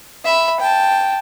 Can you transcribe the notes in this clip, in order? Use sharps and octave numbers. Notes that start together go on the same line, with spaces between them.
E5 B5
G5 A5